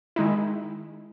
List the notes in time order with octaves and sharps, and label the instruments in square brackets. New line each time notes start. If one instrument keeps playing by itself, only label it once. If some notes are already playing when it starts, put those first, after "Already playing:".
[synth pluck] D#3 G#3 D#4 E4